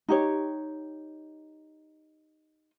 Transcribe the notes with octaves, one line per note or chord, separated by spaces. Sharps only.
D#4 G4 C#5